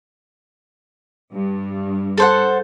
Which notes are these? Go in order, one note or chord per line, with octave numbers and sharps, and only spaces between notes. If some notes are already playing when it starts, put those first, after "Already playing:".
G2
A4 C5 F#5